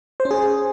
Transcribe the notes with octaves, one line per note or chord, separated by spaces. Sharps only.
C5
C#4
G#4